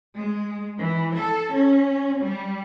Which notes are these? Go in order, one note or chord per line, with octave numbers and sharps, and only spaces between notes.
G#3
E3
A4
C#4
G3